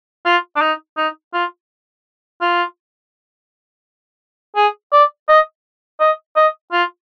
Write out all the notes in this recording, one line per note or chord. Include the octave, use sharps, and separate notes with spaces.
F4
D4
D#4
D#4
F4
F4
G#4
D5
D#5
D#5
D#5
F4